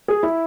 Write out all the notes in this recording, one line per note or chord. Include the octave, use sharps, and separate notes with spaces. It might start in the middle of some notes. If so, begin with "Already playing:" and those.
G#4
E4